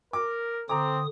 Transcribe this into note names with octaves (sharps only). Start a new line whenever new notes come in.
A#4 D6
D3 C4 A#5 D6 D#6